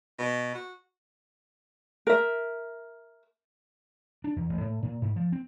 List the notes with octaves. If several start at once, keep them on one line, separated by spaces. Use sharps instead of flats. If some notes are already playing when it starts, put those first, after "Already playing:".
B2
F#4
A#4 E5
D4
E2
A1
A2
A#2
G#2
F3
C4